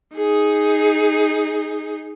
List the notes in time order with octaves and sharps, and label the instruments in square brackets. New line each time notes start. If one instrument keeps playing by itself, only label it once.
[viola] D#4 G#4